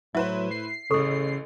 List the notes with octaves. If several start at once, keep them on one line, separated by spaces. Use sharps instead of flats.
A2 F#3 E4 B4 C5 E5
C7
A1 C#3 A4 C#6 E6